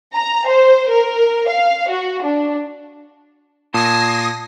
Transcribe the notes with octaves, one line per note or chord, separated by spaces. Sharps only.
A#5
C5
A#4
F5
F#4
D4
A#2 A5 D#6 G#6 A#6 C7